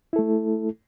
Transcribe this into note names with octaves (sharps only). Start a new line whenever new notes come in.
A3 E4 A4